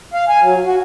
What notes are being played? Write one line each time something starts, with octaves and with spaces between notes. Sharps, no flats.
F5
G#5
F#3
F#4